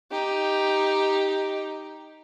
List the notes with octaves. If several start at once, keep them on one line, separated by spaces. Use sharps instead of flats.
D#4 G4